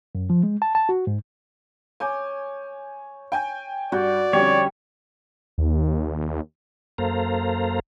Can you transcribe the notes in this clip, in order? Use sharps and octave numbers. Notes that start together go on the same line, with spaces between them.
F#2
F3
G#3
A5
A5
F#4
G#2
C#5 G#5 D6 G6
G5 G#5 G6
G2 G3 F#4 D5 G6
F2 D3 G3 C#4 C#5
D#2
F#2 A#3 A4 C5 F5 A#5